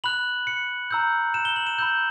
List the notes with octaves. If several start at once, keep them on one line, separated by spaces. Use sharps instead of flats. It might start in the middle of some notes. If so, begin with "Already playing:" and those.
B5 F#6 F#7
C#7
A#5 E6 G6
E7
G7
F#7
E7
B5 E6 G6